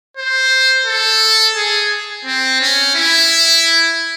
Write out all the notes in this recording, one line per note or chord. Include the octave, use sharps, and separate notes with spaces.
C5
A4
G#4
C4
C#4
E4